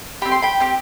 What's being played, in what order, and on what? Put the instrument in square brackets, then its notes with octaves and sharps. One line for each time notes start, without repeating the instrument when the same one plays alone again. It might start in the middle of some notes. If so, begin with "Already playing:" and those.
[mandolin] C4 G4 B5
C6
G5 B5
C4 G4